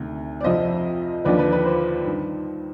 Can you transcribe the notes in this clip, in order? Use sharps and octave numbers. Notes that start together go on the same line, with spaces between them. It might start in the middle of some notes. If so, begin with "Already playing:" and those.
Already playing: D2 C3 D#3
D5
F2 C3 F3 C5 D#5
D#2 D3 F3 B4 D5
B4
B4
C5
G2 D#3